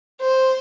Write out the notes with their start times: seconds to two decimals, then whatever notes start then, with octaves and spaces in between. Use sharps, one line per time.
0.21 C5